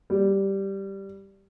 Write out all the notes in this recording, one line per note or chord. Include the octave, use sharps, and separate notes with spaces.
G3